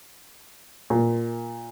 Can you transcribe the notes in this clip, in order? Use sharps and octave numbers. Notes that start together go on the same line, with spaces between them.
A#2